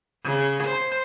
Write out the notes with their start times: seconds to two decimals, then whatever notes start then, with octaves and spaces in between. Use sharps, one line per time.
0.24 C#3
0.64 C5